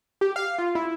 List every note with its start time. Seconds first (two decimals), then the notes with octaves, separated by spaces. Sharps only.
0.21 G4
0.36 F5
0.58 F4
0.75 E4